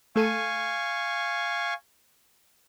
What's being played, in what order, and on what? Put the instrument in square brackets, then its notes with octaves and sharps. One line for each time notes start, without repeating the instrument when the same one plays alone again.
[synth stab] A3 A4 D#7 [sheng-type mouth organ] F5 G#5 C#6